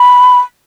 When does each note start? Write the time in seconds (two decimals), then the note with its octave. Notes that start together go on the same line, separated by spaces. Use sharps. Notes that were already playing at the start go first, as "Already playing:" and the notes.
Already playing: B5